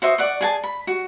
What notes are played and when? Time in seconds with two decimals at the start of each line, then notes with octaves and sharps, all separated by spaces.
0.02 F#4 C5 E5 D#6
0.18 D5 F#5 C#6
0.41 G#4 G#5 A5
0.64 B5
0.87 F#4